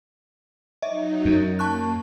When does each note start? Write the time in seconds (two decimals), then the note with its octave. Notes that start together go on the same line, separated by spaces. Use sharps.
0.82 F#3 D#4 D#5 E5
1.25 F#2
1.59 A#3 A5 C#6 F#6